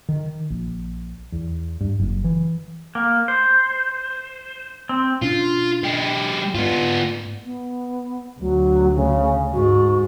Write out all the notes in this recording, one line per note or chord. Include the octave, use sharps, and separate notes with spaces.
D#3
A#1
E2
G2
F#1
E3
A#3
C5
C4
B2 C#4 D4 F4
G#3 G4
G#2 B3 F4
B3
D2 F#3
C#3
G#2 F#4